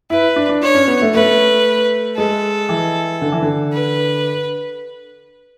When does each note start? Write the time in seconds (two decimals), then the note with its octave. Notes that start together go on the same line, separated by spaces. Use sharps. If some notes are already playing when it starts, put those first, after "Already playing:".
0.10 E4 B4
0.36 D4
0.49 D4
0.63 D4 C#5
0.75 C#4
0.88 B3
1.01 A3
1.14 A3 B4
2.18 G#3 A4
2.69 E3
3.22 D3
3.32 E3
3.42 D3
3.73 B4